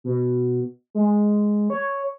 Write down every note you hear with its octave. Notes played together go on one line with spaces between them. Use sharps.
B2
G#3
C#5